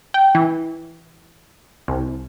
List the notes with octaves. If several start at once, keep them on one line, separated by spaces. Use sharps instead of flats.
G5
E3
C2